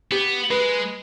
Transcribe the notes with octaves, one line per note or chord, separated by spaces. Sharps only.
B3 G4
G#3 B4